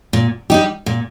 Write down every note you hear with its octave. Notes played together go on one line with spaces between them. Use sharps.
A#2
G3 D#4 G4
A#2